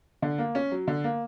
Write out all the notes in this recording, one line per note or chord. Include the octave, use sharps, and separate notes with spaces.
D3
A#3
C#4
F#3
D3
A#3